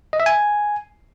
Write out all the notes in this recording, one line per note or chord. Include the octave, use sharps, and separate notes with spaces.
D#5
E5
G#5